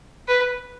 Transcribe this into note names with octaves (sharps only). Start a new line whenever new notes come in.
B4